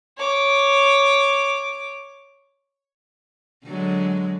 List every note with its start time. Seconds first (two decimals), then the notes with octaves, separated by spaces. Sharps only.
0.17 C#5 D6
3.66 D3 F#3 G#3